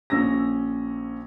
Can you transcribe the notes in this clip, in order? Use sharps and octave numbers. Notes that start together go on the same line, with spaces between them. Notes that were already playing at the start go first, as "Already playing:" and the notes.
A#1 C#4 E6 A#6